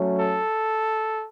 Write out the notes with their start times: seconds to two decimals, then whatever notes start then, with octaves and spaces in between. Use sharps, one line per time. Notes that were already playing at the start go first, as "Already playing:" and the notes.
Already playing: F#3 A3 C#4
0.20 A4